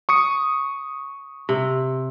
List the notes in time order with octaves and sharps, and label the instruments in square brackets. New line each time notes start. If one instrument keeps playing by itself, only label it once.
[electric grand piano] C#6 D#6 C#7
[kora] C3